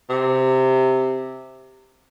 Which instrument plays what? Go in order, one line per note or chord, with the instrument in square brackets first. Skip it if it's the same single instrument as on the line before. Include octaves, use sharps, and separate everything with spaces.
[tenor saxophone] C3